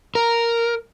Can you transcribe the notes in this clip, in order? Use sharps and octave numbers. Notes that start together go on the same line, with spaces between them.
A#4